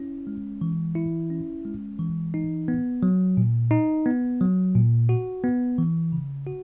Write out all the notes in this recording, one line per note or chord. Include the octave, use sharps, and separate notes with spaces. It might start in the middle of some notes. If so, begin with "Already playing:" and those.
Already playing: C#4 E4
G#3
E3
E4
C#4
G#3
E3
D#4
B3
F#3
A#2
D#4
B3
F#3
A#2
F#4
B3
E3
C#3
F#4